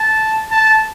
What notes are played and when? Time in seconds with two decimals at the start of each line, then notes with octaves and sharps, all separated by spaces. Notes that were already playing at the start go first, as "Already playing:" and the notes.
Already playing: A5
0.51 A5